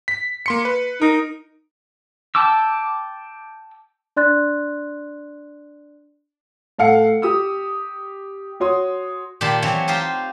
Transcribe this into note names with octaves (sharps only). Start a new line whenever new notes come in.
B6
A#3 C6 C#7
B4
D#4 A#4
G5 A5 D6 E6
D4 D5 C6 F#6 A6
A2 A4 F5 F#5 C#7
G4 D#6 E6
F#4 C#5 C6 D#6
A#2 D#3 G4 A5 C6
E3 F#3 C4 C#5
D#4 F4 G4 C5